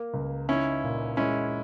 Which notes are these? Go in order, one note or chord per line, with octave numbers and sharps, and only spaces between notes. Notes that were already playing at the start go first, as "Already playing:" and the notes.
Already playing: A#3
C#2
C#4 D#4 E4
A#2
G#3 C#4 E4